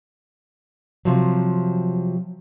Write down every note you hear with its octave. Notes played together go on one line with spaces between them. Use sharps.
C3 F3 F#3